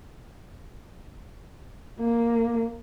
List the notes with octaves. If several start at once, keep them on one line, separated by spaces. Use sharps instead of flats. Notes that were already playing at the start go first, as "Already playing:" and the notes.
A#3